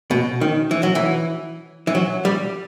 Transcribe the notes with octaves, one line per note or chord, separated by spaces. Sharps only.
B2
D#3
E3
F#3
E3
E3
F#3
G3